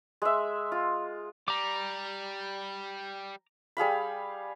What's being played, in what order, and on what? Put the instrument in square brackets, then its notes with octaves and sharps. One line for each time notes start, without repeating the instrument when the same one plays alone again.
[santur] G#3 E5
F4
[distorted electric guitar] G3 [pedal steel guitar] A#5 D6
[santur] G3 G#4 F5 B5